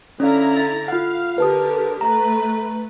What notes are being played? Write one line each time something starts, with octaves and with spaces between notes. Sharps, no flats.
D3 C#4 E4 D5 F5 A#5
A6
F4 F5 F#5
D3 G4 A#4 B4 A5 D#6
A3 B4 A#5